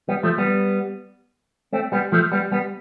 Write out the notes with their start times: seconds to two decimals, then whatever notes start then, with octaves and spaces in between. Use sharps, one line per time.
0.09 G3 B3
0.23 F3 A3
0.38 G3 B3
1.73 A3 C4
1.92 G3 B3
2.12 F3 A3
2.32 G3 B3
2.52 G3 B3